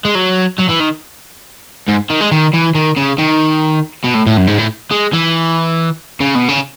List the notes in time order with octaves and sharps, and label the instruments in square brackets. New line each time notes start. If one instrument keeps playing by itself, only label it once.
[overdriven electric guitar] G#3
F#3
F#3
E3
D#3
G#2
D#3
G#3
D#3
E3
D#3
C#3
D#3
B2
A2
A2
F#2
G#2
A2
G#3
E3
C#3
B2
C#3